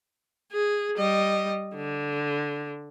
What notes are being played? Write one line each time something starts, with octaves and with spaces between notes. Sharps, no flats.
G#4
G3 D#5
D3